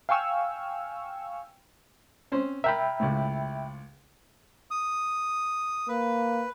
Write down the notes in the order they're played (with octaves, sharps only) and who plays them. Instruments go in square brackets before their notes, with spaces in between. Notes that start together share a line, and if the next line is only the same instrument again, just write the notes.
[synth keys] F5 G5 G#5 C#6 E6 F6
[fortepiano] C4 C#4 C5
[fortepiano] A#4 [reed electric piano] E5 G5 B5
[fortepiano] C#2 A2
[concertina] D#6
[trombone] A#3 [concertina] B4